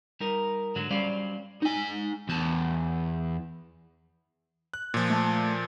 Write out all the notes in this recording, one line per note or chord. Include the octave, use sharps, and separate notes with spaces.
G3 D#4 A#4
G#2 D3 F#3 F#4
F#3 G3 C#4 C5 D5 F5
D#4 G#5
E2 A5
F#6
A#2 F3
A3 A5